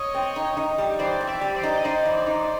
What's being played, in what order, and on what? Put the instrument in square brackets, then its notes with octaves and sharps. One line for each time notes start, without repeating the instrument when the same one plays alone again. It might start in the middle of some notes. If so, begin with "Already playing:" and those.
Already playing: [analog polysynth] C#5 D#5
[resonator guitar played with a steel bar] C4
D#4
D#4
G3
[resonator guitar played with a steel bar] E3 [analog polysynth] C5 D5
[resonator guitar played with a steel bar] C4
[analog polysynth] D5 E5
[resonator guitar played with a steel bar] G3
[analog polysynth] C5 D5
[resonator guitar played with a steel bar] D#4
[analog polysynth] D#5
[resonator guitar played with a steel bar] D#4 [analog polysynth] C5 D5
[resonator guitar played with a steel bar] E3
D#4